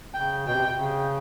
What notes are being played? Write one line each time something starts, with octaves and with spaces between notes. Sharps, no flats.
C#3 G5
B2 G5
C3
C#3